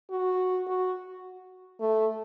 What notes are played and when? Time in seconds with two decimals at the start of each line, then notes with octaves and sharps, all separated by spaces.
0.10 F#4
0.67 F#4
1.80 A3